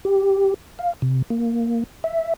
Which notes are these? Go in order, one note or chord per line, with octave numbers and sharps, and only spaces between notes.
G4
F5
C3
A#3
E5